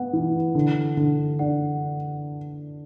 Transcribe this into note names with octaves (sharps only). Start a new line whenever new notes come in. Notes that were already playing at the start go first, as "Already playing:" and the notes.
Already playing: B3 F#5
E3
D3
D3
D4 F#5